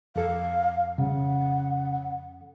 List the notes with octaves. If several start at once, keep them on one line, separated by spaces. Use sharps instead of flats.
F2 A4 F5
C#3 F#5